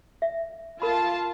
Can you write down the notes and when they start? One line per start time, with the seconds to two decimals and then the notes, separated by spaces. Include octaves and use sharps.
0.22 E5
0.82 F4 A#4 A5 B5